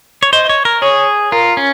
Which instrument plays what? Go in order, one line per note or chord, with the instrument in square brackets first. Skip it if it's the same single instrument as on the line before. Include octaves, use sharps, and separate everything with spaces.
[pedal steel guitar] C#5
[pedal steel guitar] C5 [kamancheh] D#5
[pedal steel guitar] C#5
A#4
[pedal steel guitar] G#4 [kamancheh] C#5
[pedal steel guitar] F4 [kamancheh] A#4
[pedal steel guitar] C#4